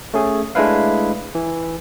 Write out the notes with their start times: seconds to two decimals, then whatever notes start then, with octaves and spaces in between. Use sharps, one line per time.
0.14 A3 C#4 G#4
0.55 G#3 A3 D4 E4 B4 F5
1.35 E3